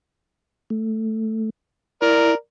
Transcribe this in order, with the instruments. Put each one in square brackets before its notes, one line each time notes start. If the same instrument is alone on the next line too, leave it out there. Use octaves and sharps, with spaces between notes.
[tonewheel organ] A3
[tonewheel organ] E4 [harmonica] A#4 D5